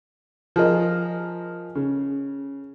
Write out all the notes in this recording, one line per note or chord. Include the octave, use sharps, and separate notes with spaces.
F3 G#4 A#4 D#5
C#3